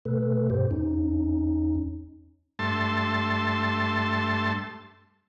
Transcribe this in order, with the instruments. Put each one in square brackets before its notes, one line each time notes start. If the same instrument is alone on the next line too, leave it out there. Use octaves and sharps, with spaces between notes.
[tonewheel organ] B2 A3 A4 B4
G2 B2 G4 C5
E2 C#4 D#4
[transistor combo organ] G2 A3 A5 C6